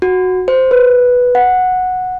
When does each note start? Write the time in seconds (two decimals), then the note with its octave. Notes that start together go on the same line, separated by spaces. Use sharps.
0.02 F#4
0.48 C5
0.71 B4
1.35 F#5